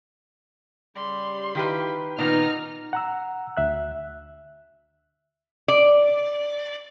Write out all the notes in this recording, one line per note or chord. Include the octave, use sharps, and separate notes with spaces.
C#3 G3 C6
D#3 E4 F4 G4 B4 G5
A#2 D#3 B3 D#4 A#5 F6
F#5 A#5 E6
D2 E5 F#6
D5